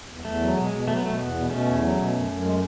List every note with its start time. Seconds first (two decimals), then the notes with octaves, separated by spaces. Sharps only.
0.09 E2
0.24 E2 A3
0.41 F#3
0.57 B2 G#3
0.71 B2
0.87 F#3 A3
0.97 B3
1.03 B2 A3
1.19 E2 B3
1.35 B2
1.50 B2 A3 C#4
1.66 E2
1.81 F#3
1.97 B2
2.13 F#2
2.29 F#2
2.44 G#3